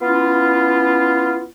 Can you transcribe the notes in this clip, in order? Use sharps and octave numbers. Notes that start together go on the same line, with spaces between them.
B3 C#4 E4 F4